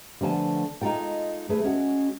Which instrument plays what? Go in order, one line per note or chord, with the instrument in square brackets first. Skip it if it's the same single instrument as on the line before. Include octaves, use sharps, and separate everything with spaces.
[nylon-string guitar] D3 F3 A3 B3 G#5 A5
G#3 D#4 F4 A4 G5
A3 G#4 B4
G#3 C#4 F#4